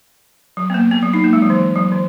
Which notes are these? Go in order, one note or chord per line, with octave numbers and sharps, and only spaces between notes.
F#3
B3
A#3
B3
F#3
D#4
A#3
G#3
F#3
E3
F#3
E3